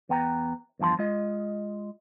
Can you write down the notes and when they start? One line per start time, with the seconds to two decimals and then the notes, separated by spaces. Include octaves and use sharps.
0.09 E2 B3 B4 G5 A5 A#5
0.79 E2 G2 F3 A5 C6
0.99 G#3 F4 D#5